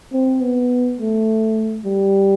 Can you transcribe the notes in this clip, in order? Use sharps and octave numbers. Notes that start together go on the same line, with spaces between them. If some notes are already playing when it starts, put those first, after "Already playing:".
C4
B3
A3
G3